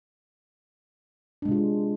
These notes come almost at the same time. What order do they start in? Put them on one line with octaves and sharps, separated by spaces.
D4 G#3 C3 F4